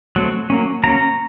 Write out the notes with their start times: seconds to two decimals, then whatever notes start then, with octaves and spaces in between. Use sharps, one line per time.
0.16 F#3 A3 C4
0.50 F#3 A#3 C#4
0.84 F#3 A#3 C#4 A#5